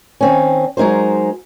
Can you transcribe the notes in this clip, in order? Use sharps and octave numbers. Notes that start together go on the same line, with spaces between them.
D#3 C4 C#4
F#3 G#3 D#4 A#4 C5